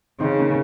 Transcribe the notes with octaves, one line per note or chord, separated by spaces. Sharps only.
C#3 C4 D#4
A#3 C#4